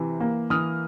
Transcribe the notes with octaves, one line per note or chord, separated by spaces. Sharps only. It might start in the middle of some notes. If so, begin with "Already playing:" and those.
Already playing: C3 E3
A#3
E3 D#6 F6